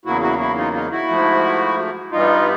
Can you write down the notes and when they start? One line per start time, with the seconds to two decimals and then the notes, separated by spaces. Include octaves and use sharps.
0.05 E2 C#3 F#3 A#3 E4 F#4
0.22 E4 F#4
0.40 E4 F#4
0.57 D#4 F4
0.74 D#4 F4
0.92 E4 F#4
1.08 G#2 F3 A3
2.11 G2 E3 G3 B3 D#4 F4